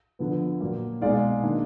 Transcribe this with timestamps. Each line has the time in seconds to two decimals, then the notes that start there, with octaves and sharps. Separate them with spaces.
0.19 D3 F3 B3
0.61 A#2 F#3 A#3
1.01 B2 G#3 D#4 D5 F5
1.43 D#3 A#3 D4